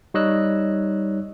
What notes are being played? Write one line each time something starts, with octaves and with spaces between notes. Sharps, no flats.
G3 D#4 C#5 D#5 E6 F#6